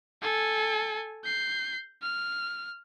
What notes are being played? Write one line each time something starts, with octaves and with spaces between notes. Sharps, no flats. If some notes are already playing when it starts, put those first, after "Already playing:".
A4 G#5
G6 C7
F6